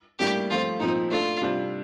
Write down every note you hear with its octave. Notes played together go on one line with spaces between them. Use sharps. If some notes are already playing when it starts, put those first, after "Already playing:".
A2 G3 A#3 D4 G4
F3 A3 C4 F4
A#2 F3 C4 D#4
A3 D4 F4 A4
C3 G3 D4 F4